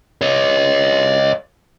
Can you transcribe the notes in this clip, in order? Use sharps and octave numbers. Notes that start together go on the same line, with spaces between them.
C#5 D#5